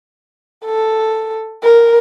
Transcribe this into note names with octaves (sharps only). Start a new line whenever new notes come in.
A4
A#4